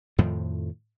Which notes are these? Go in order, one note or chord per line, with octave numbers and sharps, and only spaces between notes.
F2 A2 D#3 F3